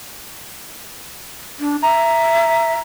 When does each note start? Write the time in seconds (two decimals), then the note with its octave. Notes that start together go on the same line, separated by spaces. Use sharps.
1.60 D4
1.82 E5 A#5